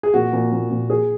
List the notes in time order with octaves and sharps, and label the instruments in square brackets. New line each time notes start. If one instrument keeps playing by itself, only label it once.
[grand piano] G#4
[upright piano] A#2 [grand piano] F#4
[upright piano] A#2
A#2
A#2
G#4